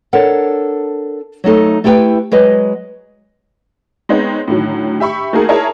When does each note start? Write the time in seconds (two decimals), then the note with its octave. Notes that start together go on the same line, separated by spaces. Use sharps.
0.13 D4 A4 A#4 C#5 F#5
1.44 F#3 A3 D#4 A4
1.84 A3 E4 G4 G#4 B4 G5
2.32 F#3 G#3 B4 D#5
4.09 G#3 B3 C4 D#4 C#5
4.48 A2 D3 D#3 F#3
5.00 G4 E5 B5 C#6
5.33 A3 A#3 D#4 F#4 G#4 A#4
5.49 E4 G#4 A#4 C#5 A5